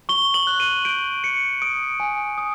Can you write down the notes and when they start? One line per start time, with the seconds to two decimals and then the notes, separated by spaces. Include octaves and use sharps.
0.09 C#6 G7
0.34 F#7
0.47 F#6
0.60 D#7
0.85 G6 D7
1.23 C#6 C#7
1.62 D#6 D7
2.00 G#5
2.38 D#6